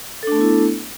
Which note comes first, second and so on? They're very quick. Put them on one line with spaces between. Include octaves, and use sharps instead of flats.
A4 D4 A3 B3 E4